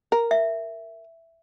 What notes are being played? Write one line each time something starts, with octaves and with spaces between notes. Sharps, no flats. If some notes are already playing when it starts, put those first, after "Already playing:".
A#4
E5